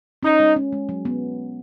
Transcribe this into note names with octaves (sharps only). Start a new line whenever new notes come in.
C#4 D#4
G#3
C#4
G#3
F#3
B3